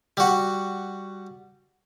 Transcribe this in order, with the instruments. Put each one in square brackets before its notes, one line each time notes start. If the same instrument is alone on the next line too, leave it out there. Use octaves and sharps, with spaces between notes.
[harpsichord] G3 F#4